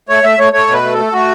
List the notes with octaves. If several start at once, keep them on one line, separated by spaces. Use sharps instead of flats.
A3 C#5
A3 E5
A3 C#5
A3 C#5
B2
B4
A3
A4
A3
A3 F#4